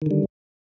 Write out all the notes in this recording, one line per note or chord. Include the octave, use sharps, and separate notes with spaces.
D3 D#3 G3